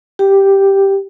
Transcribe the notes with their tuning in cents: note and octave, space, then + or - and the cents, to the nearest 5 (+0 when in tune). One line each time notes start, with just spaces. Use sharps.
G4 +0 G5 +0